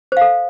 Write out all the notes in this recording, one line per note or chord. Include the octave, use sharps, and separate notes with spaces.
A4 C5 F5